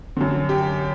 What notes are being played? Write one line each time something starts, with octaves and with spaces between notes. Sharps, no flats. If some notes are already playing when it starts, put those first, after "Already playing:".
F#2 D3
G4